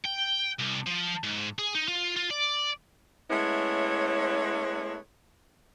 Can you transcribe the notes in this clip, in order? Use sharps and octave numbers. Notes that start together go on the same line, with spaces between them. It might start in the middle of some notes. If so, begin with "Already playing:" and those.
G5
C2
F3
G#2
G#4
D#4
F4
F4
D5
G#3 A3 B3 C#4 E4 C#5